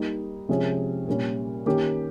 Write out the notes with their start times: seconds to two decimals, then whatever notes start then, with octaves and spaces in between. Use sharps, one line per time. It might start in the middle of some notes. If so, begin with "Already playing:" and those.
Already playing: G3 A#3 D#4
0.49 C3 F3 G#3 C#4 G#4
1.08 A#2 G3 C#4
1.66 D#3 A#3 C#4 G4 A#4